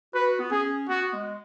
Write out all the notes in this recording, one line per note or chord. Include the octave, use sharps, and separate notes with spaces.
F#4 B4
B3
C#4 G#4
B3 F#4
G#3